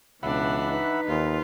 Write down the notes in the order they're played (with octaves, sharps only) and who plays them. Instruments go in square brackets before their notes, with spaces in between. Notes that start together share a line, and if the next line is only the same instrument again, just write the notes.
[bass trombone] C#2 [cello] B2 [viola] E3 D4 [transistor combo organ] E5 F#5 B5
[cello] D#4 B4
[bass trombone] D#2 [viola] F4